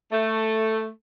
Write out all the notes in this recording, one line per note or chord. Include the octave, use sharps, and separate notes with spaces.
A3